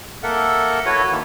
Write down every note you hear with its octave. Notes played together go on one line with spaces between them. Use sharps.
A#3 A4 A#4 E5 F#5
E4 F#4 A4 B4 C#5
D#3 E3 A#3